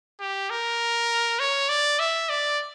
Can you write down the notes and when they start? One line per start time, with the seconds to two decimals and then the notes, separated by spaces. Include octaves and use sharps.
0.20 G4
0.50 A#4
1.40 C#5
1.69 D5
1.99 E5
2.29 D5